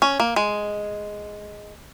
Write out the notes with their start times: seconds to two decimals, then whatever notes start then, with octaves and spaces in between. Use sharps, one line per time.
0.02 C#4
0.20 A#3
0.36 G#3